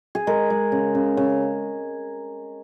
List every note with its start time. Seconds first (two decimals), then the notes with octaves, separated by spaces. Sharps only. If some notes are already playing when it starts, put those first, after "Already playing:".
0.15 G#4
0.27 G#3 A#4
0.50 G#3
0.72 C#3
0.95 C#3
1.17 C#3